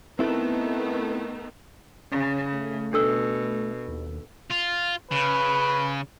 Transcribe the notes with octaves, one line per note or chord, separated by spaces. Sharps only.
D#3 A3 B3 C4 E4 A4
C#3 C#4
A3
B2 D4 A4 E6
D#2
F4
C#3 B4